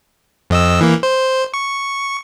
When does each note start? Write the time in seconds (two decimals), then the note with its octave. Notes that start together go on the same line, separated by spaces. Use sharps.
0.50 F2 D#5 E6
0.81 E3 A#3
1.03 C5
1.54 C#6